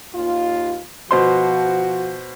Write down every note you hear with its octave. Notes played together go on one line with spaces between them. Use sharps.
D#2 F4
B2 F3 F#4 C5 C6